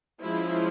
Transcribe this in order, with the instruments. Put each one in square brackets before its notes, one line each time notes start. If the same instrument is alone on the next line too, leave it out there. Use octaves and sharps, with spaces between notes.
[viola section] F3 G#3 C#4 E4